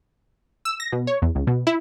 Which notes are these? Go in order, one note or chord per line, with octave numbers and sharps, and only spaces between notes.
E6
A#6
B2
C#5
E2
C#2
B2
E4